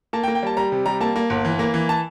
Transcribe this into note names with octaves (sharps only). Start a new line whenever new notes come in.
A#3 A5
G5
A#3
G5
G3 A5
G3 A#5
C3
G3 A#5
A#3 A5
A#3
G1
E3
A#3
E3
A5